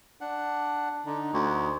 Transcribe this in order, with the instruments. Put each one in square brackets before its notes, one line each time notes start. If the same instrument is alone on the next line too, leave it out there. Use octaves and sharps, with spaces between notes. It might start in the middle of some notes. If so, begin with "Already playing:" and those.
[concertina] D4 F#5
[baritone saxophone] D3 [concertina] D#4
[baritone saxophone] D2